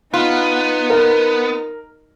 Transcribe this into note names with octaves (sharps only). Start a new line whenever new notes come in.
B3 D#4 F4
A#4